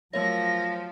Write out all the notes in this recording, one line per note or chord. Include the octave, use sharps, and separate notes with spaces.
F3 F#3 A3 A#4 C#5 A#6